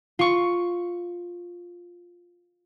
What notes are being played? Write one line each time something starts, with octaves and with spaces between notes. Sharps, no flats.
F4 C#6